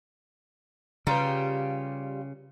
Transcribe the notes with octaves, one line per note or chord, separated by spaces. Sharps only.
C#3 G3 F4 B4 A#5